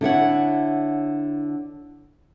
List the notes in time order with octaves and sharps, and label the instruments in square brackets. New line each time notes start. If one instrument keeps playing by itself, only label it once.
[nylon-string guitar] D3 E4 C#5 F#5